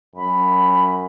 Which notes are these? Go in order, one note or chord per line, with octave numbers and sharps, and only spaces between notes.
F#2 B5